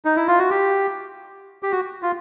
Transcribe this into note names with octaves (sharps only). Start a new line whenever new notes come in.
D#4
E4
F4
F#4
G4
G4
F#4
F4